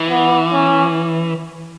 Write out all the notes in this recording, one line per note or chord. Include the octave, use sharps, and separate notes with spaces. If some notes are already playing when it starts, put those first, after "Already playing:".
Already playing: E3
B3
C#4